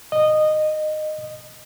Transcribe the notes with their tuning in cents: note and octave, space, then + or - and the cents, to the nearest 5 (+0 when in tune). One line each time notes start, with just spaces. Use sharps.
D#5 -15